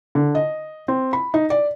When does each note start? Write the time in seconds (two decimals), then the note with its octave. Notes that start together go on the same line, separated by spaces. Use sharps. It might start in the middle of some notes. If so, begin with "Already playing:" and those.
0.15 D3
0.35 D#5
0.88 C4
1.13 B5
1.34 D#4
1.50 D5